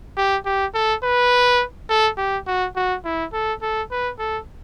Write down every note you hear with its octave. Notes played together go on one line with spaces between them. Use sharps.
G4
G4
A4
B4
A4
G4
F#4
F#4
E4
A4
A4
B4
A4